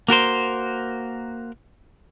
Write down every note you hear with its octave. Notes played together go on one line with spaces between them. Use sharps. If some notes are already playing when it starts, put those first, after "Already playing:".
A#3 F#4 A#4 C5